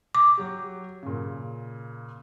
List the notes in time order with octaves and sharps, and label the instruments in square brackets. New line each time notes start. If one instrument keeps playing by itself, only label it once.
[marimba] D6
[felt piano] F#3 G4
A#2 C#3